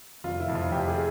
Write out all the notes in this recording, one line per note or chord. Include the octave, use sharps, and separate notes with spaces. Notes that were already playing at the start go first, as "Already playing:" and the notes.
F1 F4
E4
F2
F4
F2 G4
G#4